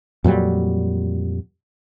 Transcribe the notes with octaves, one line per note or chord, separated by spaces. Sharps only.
F2 A#2 F#3 G3